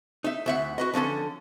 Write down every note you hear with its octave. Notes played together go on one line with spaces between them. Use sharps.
D#4 E5
D2 E5 F#5
F#4 B4 D#5
D3 F3 C#4 A4